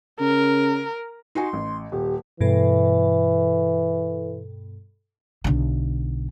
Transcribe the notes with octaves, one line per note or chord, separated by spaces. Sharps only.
C#3 A#4
D#4 F#4 G#5 C6
A1
D#1 G4
G2 B2 E3 A4
B1 D3